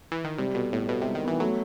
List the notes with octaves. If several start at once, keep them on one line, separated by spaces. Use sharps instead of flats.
E3
D#3
C3 G3
B2 A4
A2 B3
B2 A4
C3
G3
D#3
E3 B3
F#3 A3